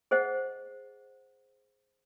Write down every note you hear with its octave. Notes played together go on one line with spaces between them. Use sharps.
G#4 C5 D#5 F#5